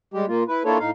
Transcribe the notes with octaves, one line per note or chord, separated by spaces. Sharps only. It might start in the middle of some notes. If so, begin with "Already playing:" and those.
G3 G#3 G4
A#2 A#3 F4
E4 B4
A#3 D4 E4 F4 A4 C#5
A2 D#4 F5